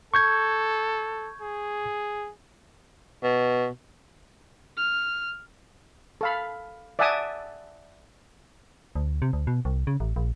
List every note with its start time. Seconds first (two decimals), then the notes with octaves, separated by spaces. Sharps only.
0.14 A4 C#6 G6 G#6
1.41 G#4
3.23 B2
4.77 F6
6.21 A4 F5 B5
6.99 D5 E5 F#5 G#5 A5 D#6
8.96 D2
9.22 C3
9.33 D2
9.47 B2
9.65 C2
9.87 C#3
10.00 A1
10.16 A#1